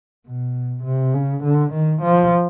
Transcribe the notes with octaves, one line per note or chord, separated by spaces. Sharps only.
B2
C3
C#3
D3
D#3
F3